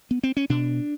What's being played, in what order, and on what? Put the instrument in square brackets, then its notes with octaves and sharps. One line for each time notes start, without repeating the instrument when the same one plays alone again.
[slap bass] B3
C4
C#4
B2 D4